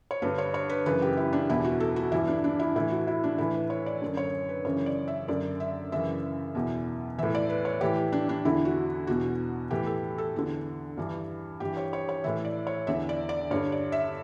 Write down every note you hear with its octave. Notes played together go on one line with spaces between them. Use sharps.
C#5
G2 D3 B4
C#5
C#5
B4
F#2 C#3 E3 B4
G4
E4
D4
E2 B2 E4
F#4
A4
F#4
G2 E3 E4
D4
D4
E4
A2 E3 E4
F#4
E4
D4
A2 E3 E4
B4
C#5
D5
F#2 D3
C#5
B4
F#2 C#3 E3 C#5
D5
E5
F#2 D3 D5
E5
F#2 C#3 E3 E5
E2 B2
A2 E3 E5
D5
B4
C#5
A2 E3 G4
D4
D4
E2 D3 E4
F#4
E2 B2 F#4
A2 E3 G4
A4
A4
E2 D3
G2 E3
G2 E3 G4
C#5
C#5
C#5
A2 E3 E5
D5
C#5
E2 D3 E5
D5
D5
G2 D3 C#5
D5
E5